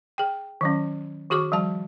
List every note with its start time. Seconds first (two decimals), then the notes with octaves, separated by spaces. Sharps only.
0.18 G#4 G5
0.61 D#3 F#3 C#4
1.30 D#3 F#4 G#4 C#6 D6
1.52 F3 G3 A5